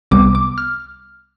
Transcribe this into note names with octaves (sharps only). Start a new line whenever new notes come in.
C2 C3 G3 B3 D6
D6
F6